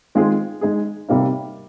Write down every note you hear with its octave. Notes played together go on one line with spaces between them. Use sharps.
D#3 G#3 C4 F4 G#4
G#3 D#4 G#4
C3 G3 A#3 D#4